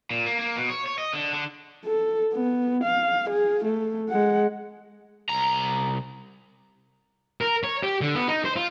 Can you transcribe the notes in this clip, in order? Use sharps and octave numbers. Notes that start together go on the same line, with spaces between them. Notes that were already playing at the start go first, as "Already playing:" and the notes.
A#2
A#3
A#3
B2
C#5
C#5
D#5
D3
D3
A4
B3
F5
G#4
A3
G#3 F#5
C2 A#5
A#4
C#5
G4
D3
B3
D#4
C5
F4